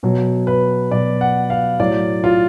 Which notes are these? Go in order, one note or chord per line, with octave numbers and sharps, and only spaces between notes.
B2 F#3
B4
B2 F#3 D5
F#5
F5
A2 F#3 D5
F4